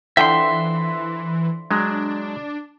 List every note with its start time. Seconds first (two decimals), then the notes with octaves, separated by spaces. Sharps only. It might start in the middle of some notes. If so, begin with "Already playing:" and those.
0.17 D3 E3 F3 E5 G5 C6
1.71 F#3 G#3 D4